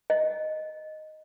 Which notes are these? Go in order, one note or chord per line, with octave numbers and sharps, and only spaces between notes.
D#5